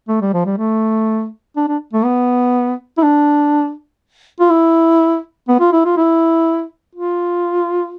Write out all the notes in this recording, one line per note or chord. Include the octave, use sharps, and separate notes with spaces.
A3
G3
F3
G3
A3
D4
D4
A3
B3
E4
D4
F4
E4
B3
F4
E4
F4
E4
F4